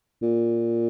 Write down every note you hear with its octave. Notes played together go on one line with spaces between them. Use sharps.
A#2